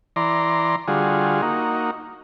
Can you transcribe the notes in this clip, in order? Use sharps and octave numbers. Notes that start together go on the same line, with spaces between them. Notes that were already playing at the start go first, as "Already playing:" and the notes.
E3 D5 A#5 C6
D3 G3 F4 F#4 G#4
A#3 D#4 F#4